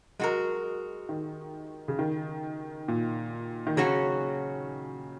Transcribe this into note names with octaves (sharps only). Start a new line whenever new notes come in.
F#3 G#3 F#4 A#4
D#3
C#3
D#3
A#2
D#3
C#3 F#3 C#4 F#4